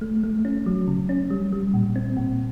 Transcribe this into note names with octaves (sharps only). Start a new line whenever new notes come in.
A3
A3
C#4
F#3
C#3
C#4
G3
G3
A#2
C4
A#2